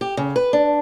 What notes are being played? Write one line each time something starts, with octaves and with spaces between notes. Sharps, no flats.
G4
C#3
B4
D4